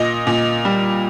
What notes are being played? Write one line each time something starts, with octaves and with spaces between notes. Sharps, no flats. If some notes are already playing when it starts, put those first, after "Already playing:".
Already playing: A#2 D#5
A#2
G3